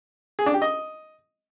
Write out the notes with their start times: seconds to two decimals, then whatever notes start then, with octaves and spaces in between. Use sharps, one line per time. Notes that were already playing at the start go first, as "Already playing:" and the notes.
0.39 G#4
0.46 D4
0.54 G4
0.62 D#5